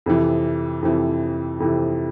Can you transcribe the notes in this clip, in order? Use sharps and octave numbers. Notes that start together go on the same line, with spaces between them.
F2 C3 E3
F2 C3 E3
F2 C3 E3